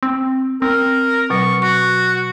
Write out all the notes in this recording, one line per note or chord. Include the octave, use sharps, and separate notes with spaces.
C4
C4 A#4
B2 F#3 C#6
F#4 C#6